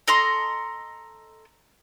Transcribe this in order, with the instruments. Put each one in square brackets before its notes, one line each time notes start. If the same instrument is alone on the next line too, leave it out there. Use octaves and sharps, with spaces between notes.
[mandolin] A4 D#5 A#5 C6